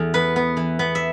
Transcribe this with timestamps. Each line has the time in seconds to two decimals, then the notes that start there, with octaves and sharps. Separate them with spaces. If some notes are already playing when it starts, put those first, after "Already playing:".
Already playing: E2 A4
0.14 B3 B4
0.36 B3
0.57 E3
0.79 B3
0.95 E5